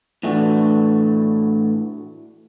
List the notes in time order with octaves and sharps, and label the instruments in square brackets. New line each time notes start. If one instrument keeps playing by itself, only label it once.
[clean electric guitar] A2 E3 A3 D4 F#4